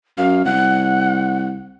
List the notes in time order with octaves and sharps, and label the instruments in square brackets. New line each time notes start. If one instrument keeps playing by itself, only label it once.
[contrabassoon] F#2 [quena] F5
[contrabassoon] C2 [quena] F#5